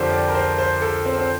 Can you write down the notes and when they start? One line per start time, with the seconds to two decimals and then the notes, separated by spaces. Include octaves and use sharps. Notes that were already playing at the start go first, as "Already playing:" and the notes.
Already playing: F2 D3 F3 G4 A4 A#4 C5 D5
0.12 D5
0.29 A#4
0.35 C5
0.58 C5
0.82 A4
1.06 C4
1.19 C4